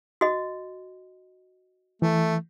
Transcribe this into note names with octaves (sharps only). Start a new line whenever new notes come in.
F#4 D#5
E3 A3